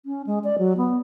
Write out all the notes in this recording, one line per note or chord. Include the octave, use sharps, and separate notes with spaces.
C#4
G#3
D5
F#3
B3